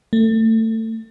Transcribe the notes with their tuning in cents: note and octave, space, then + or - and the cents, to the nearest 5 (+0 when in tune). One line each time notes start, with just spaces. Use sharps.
A3 +25